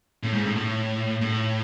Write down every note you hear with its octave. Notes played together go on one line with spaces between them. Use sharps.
A2
G#2
A2
A2
A2